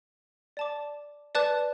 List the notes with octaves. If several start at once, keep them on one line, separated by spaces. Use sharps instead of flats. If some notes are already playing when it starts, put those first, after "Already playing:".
D5 A5 D6
B4 D5 A5 D6 F#6